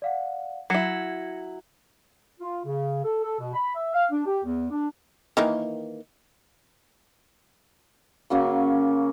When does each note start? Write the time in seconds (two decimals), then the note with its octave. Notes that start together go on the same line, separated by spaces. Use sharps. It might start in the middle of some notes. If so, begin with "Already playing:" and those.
0.02 D5 F5 F#5
0.70 F#3 E4 G#6 A#6 C#7
2.40 F4
2.64 C#3
3.04 A4
3.24 A4
3.38 B2
3.54 B5
3.74 E5
3.94 F5
4.11 D4
4.25 G4
4.44 E2
4.70 D4
5.37 D#3 E3 A#3
8.30 C#3 F#3 A#3 C#4